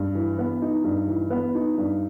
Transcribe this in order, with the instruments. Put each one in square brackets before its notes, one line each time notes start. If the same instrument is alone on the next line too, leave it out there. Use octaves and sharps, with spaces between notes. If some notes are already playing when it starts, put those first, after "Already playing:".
Already playing: [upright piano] G2
E3
B3
D#4
G2
E3
B3
D#4
G2